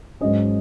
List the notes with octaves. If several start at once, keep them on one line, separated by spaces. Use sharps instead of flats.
G#2 F#3 C#4 D#5